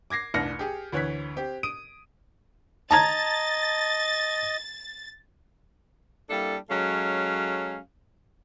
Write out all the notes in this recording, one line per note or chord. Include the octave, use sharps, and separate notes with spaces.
D6 G#6 A#6 C7
F1 C2 D4 F6 A#6 C#7
G4 G#4
D2 E3 C#5 F#6 G#6 B6
C4 G4
D#6 D7 D#7
D#5 A5 A#5 G#6 A6
G3 A#3 D4 E4 A4
F#3 G#3 C#4 A4 F5